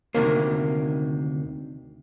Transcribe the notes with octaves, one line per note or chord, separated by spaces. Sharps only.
D2 C3 D#3 A#3